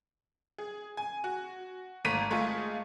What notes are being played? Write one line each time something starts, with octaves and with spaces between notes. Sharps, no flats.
G#4
G#5
F#4
G#1 A3 A#3 A#5 B6 D#7
G#3 A3 F4 G#4 A4